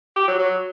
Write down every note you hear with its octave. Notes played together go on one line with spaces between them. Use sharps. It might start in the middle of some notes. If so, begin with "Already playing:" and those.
G4
F#3
F#3